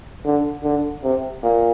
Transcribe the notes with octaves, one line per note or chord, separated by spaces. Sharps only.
D3
D3
C3
A#2